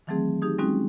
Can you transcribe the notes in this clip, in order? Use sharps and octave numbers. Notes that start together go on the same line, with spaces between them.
D#3 E3 F#3 A3 C4 G#4
D#4 G4 G#4 D#6
G3 G#3 C4 C#4 D#4 F#4